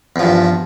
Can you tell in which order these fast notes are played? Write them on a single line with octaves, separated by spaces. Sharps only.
E2 F3 G2